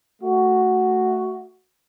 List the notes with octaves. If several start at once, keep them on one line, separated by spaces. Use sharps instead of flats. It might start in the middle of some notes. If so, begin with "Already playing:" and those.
A3 F#4